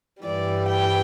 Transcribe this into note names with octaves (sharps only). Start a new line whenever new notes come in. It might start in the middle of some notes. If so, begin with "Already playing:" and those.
G2 E3 G3 D5
G5